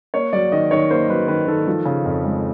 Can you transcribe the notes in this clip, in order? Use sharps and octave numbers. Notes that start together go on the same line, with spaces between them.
A#3 C#5
F#3 D5
D#3 D#5
D#3 C#5
A#3 C5
F#3 B4
D#3 B4
D#3 A4
F3
C#3
F2
G#3